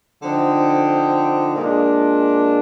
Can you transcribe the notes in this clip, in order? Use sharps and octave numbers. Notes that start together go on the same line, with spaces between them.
D3 F3 C4 D#4
A#2 G#3 D4